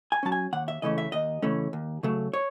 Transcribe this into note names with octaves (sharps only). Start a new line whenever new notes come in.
G#5
F#3 C#4 A5
G#5
D#2 F#5
E5
C#3 E3 A3 C#4 D#5
E5
D#2 D#5
C#3 E3 A3 C#4
D#2
C#3 F#3 A3
C#5